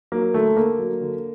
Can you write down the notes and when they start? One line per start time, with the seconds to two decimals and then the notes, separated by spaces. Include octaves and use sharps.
0.12 F#3 A#3
0.34 D3 A3
0.57 D3 A#3
0.79 F#3
1.01 D3